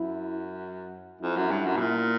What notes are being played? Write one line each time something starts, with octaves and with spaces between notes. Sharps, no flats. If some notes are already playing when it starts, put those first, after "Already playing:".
Already playing: F#2 E4
F2 E4
F#2
G2
F#2
B2
A#2